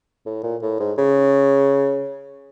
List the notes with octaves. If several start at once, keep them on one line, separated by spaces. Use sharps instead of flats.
A2
A#2
A2
G#2
C#3